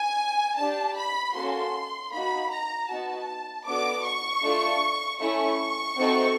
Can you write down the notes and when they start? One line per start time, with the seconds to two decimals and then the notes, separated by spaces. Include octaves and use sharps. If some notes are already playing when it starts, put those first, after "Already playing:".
Already playing: G#5
0.57 D4 G4 A5
0.96 B5
1.35 A#3 C#4 F#4 A4 C6
2.11 A#3 D#4 F#4 B5
2.51 A#5
2.89 B3 D#4 F#4 A5
3.66 B3 D4 F#4 A4 D6
4.05 C#6
4.43 A3 D4 F4 A4
5.20 A3 C#4 E4 C#6
5.97 A3 C4 D#4 F#4 A4